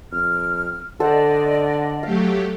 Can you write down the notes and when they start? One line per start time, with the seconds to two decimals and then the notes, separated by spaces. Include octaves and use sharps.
0.12 F2 F6
1.00 D3 A4 C5 D5 D#5 F#5
2.03 F#3 A3 G4 F5